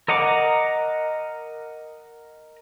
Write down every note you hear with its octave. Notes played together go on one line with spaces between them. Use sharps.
A#4 D#5 F#5 A#5 D6